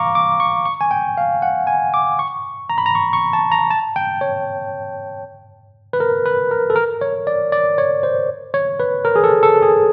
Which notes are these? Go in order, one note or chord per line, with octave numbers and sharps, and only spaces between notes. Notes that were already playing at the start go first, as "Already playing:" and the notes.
Already playing: F5 A#5 C#6 D6
D6
C#6
C#6
G#5
G5
F5
F#5
G#5
D6
C#6
A#5
B5
A#5
C#6
C#6
A5
A#5
A5
G5
C#5
B4
A#4
B4
A#4
A4
A#4
C#5
D5
D5
C#5
C5
C#5
B4
A#4
G#4
A4
A4
G#4